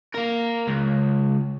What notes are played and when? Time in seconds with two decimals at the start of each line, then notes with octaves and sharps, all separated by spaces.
0.14 A#3 A#4
0.67 C#2